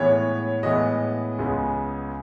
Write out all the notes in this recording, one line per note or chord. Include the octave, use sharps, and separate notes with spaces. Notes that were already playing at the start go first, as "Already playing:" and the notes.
Already playing: A2 E3 G#3 B3 C#5
A2 E3 G#3 B3 D#5
C#2 C#3 G#3 B3